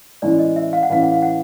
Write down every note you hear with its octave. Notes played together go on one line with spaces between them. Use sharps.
A2 E3 G#3 C#4 E4 D5
D#5
E5
F5
F#5
A2 E3 G#3 C#4 E4 F5
F#5
F5
F#5